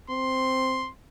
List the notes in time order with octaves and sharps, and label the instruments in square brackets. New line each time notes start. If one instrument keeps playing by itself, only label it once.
[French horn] C4 [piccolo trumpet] C6